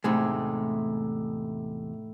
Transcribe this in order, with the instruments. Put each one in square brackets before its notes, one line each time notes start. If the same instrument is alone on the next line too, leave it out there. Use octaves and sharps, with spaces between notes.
[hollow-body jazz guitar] E2 C3 G#3 [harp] A2 D#4